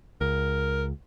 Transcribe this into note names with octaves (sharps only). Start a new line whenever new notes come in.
C#2 A#4